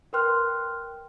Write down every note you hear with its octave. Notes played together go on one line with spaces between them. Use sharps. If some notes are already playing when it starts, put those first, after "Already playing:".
A#4 B4 G5 C6 F6 F#6